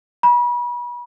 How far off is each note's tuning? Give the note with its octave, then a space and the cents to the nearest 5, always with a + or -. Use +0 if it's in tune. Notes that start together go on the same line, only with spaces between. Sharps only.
B5 -35